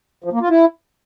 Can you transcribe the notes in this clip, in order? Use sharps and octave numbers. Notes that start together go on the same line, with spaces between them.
F3
A#3
F4
E4